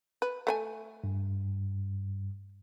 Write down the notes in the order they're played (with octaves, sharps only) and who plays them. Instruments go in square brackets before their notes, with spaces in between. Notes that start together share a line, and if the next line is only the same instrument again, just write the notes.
[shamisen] B4
A3 B4 G#5
[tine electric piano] G2